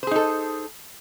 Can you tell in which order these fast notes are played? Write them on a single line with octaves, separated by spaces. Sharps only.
C5 G#4 D#4 A4